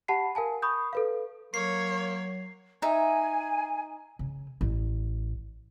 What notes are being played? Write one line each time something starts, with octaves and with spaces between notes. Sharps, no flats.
G4 F#5 A5 B5 C7
A#4 F5 G#5 A5
B5 C#6 D#6 G6
A4 B4 F5
F#3 A#3 C#5 C7
D#4 E5 G#5
C#3
A1